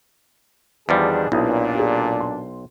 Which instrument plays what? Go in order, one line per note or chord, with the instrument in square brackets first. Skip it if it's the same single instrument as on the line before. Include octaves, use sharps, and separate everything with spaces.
[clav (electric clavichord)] E2 F3 G3 [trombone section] D#3 D4 G#4
[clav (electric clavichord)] B1 [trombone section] A#2 D4 [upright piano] E4 B4 D#6
[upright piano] G4 G#4
C6